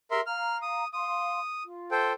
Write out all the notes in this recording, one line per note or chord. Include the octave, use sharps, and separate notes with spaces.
G4 G#4 A#4 E5 C6
F5 A#5 F6
D#6
F5 C6 D#6
F4
A4 C5 G5